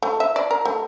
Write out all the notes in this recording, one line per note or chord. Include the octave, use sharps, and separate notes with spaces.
A3
E5
D5
A#4
A3